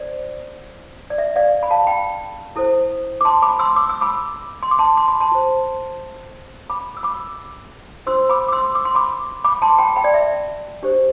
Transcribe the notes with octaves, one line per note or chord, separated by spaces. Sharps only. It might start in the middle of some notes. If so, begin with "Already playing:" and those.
Already playing: D4 A4 C5 D5
D5
E5
D5 F5
B5
F5 A5
G5 B5
E4 A4 C5
D6
A5 C6
B5 D6
C6 E6
D6
E6
B5 D6
C6
D6
A5 C6
C6
B5
A5 C6
F4 C5
B5 D6
E6
B5 D6
D4 F4 C5 C6 E6
B5 D6
D6
C6 E6
D6
C6
B5 D6
B5 D6
A5 C6
G5 B5
G5 B5
D5
E5
D4 G4 C5